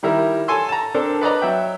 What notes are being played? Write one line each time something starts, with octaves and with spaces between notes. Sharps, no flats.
D#3 G3 E4 A#4
A4 G#5 C6 E6
A5 A#5
C4 D4 A4 A#4
B4 D5 D#5 A#5
F#3 E5 G5